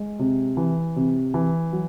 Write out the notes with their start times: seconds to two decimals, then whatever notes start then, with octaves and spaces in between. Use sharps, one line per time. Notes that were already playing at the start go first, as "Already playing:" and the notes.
Already playing: G#3
0.19 C3
0.57 E3
0.96 C3
1.34 E3
1.73 F#3